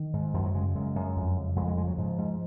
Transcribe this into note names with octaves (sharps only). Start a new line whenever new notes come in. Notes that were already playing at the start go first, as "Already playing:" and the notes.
Already playing: D#3
G#2
F#2 F3
F#3
C#3 G#3
F#2 G#3
F#2
F2
C#3
F2 G#3
G#3
C#3 G#3
F#3
G#2 F3
G#2